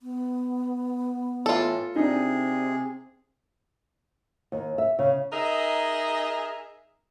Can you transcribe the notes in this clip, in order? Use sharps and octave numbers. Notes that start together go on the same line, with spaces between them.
B3
A2 E3 F4 A4
C3 C4 D4 D#4 G#4
D#2
E5
C#3
D#4 G#4 A#4 D#5 E5